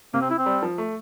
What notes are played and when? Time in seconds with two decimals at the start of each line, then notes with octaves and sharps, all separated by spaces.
0.14 C3 A#3
0.21 C4
0.30 E4
0.38 C4
0.46 G3
0.63 F3
0.78 A3